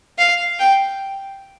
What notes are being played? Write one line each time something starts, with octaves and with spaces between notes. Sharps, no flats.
F5
G5